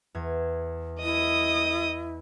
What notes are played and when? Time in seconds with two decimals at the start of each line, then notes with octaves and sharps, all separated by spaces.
0.15 E2 G#6
1.03 E4 D#5 D#6